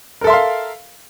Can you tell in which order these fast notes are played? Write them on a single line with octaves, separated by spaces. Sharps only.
A#4 A4 E5 C6 F5